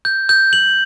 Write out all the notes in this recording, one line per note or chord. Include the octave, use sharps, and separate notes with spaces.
G6
G6
F#7